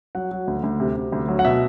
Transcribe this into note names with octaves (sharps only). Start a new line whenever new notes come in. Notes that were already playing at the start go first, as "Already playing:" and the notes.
F#3 F#5
F#3
D2
D2
C3
C3
D2
F#3
F#5
B2 E5